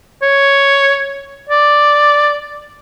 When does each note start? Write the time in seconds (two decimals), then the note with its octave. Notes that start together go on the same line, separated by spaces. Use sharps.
0.22 C#5
1.49 D5